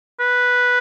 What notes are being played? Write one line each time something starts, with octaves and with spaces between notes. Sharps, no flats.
B4